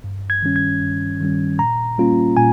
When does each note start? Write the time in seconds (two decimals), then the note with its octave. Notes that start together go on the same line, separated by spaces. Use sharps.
0.04 G2
0.30 G#6
0.43 D#3 G3 C#4
0.56 G#6
0.81 G2
1.20 D#3 G3 C#4
1.59 A#2 A#5
1.98 G3 A#3 C#4 F4
2.37 A#2 G#5